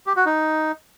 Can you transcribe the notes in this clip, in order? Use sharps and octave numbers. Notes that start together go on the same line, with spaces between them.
G4
F#4
D#4